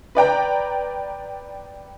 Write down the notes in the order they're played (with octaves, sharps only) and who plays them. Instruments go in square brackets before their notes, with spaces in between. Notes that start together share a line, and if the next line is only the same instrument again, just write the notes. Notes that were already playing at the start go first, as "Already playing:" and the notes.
[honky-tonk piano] B4 D5 G5 A#5